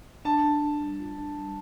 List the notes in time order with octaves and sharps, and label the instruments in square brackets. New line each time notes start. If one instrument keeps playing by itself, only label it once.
[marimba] D4 [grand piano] A5
[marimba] D4
D4
G3
F4
D4
G3